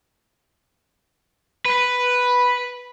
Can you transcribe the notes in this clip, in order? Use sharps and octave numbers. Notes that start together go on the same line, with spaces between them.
B4